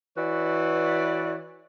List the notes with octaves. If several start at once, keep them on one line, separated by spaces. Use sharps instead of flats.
E3 F#4 B4 C#5 D5